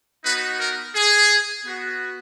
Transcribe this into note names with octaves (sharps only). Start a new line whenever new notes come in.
B3 D#4 F#4 B4
A#4
G#4
B3 F#4